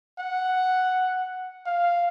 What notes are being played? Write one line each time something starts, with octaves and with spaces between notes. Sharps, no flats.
F#5
F5